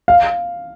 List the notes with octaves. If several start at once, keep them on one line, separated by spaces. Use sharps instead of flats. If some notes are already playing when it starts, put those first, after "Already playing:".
F5